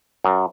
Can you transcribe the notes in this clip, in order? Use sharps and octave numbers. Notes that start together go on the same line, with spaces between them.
F#2